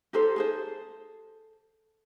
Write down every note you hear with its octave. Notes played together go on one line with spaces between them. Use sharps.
D#4 G4 A4 C5
G#4 A4 C5